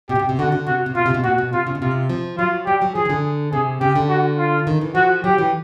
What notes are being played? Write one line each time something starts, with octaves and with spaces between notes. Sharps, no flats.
B2 G4
C3
B2
C3
D3 F#4
D3
C3 F#4
C3
B2 F4
C3
B2
A#2 F#4
B2
C3 F4
C#3
B2
C3 F4
F3
F#3 F4
G3 G4
F#3
F3 G#4
D#3
D3
C3 G#4
C#3 G4
D3
F#4
F4
D#3
E3
F3 F#4
F#3 G4
E3